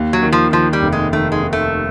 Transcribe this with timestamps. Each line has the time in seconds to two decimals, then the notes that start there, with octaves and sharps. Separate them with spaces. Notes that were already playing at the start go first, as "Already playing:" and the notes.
Already playing: D#2
0.13 F#3
0.22 D#3
0.33 F3
0.52 D#3 F3
0.73 G3
0.82 F1
0.93 G#3
1.13 D#3 A3
1.32 G#3
1.43 D#3
1.53 A3